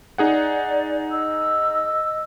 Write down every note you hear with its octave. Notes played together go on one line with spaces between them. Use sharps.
D#4 G#4 D5 F#5
D#5 E6